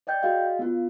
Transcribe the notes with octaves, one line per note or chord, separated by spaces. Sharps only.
D5 D#5 G5 G6
F#4 G#4 D#5 F5
B3 F4